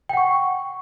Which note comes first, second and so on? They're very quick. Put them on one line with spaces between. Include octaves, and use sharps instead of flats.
G5 F#5 C#6